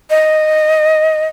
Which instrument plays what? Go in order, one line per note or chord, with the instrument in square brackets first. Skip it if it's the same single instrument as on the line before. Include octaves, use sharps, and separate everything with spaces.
[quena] D#5